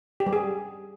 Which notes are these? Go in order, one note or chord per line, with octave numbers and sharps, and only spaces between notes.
G4
G3
G#4